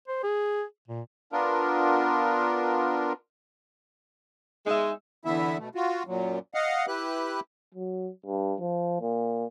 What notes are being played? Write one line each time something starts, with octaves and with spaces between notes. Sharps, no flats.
C5
G#4
A#2
B3 D4 F4 A#4
G#3 D#4 E5
E2 D3 E3 B3 E4 E5
B2 A3
F4 F#4
F#2 A#2 F#3
D#5 F5 F#5
E4 G4 B4 F#6
F#3
G2
F3
A#2